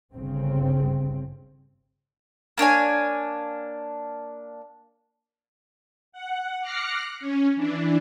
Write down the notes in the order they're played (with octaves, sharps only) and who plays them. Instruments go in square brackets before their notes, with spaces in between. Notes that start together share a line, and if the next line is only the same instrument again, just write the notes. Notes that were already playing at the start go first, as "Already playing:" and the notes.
[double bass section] G1 C2 C#3 C4
[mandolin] A#3 D4 C#5 G#5
[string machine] F#5
D6 F6 F#6 A#6 C7 C#7
C#4
E3 D4